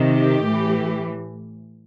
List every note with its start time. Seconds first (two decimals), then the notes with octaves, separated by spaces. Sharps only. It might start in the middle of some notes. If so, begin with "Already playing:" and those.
Already playing: C3 D#3
0.14 G4
0.45 A2 E3